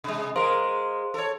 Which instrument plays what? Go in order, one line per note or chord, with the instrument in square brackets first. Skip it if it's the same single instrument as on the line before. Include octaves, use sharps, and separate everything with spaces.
[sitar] C3 G#3
[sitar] G#3 A#4 [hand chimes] C5 F5 C6
[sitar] A4 C#5